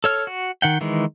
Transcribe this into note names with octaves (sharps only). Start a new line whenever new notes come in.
A4 C#5 F6
F#4
D#3 F#5 G5
D#3 E3 G#3